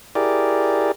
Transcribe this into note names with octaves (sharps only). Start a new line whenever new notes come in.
E4 G4 G#4 A#4 D5